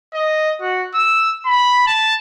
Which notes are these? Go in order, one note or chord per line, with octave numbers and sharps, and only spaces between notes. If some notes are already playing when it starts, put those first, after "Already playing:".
D#5
F#4
E6
B5
A5